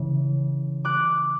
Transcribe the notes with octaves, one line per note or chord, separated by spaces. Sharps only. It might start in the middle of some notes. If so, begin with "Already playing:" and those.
Already playing: C#3 E3
D6 F#6